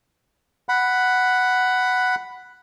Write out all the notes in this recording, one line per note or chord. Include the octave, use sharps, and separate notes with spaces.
F#5 B5